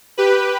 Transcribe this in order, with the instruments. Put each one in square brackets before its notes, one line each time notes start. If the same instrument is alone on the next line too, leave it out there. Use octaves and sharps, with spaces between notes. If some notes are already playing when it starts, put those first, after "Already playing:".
[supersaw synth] G4 B4